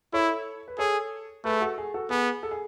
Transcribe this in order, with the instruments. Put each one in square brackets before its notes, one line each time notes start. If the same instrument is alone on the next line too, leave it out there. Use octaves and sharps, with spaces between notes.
[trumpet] E4 [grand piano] A4 C#5
[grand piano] B4
[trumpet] G#4 [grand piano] A4 C#5
[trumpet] A3 [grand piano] G#4 B4
[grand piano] F#4 A4
G#4
F#4 A4
[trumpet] B3 [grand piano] G#4
[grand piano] A4
G#4